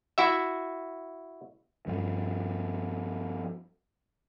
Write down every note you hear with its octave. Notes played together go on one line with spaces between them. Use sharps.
E4 F#4 E5
G2 F3